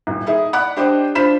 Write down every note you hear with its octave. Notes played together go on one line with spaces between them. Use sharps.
D#1
D#4 E4 G#4
D5 F#5 B5 D6 F#6
D4 G4 C5 D5 D#5 D6
D4 F4 C5 B5 B6 E7